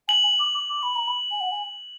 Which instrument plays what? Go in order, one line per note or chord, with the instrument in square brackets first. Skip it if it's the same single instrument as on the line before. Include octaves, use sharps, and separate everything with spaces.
[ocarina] G#5 [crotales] F#7
[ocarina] G#5
D6
D6
D6
B5
A#5
B5
G#5
F#5
G#5